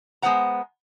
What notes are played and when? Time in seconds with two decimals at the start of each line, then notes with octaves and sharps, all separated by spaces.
0.22 G#3 B3 A#4 C5 F#5 A#5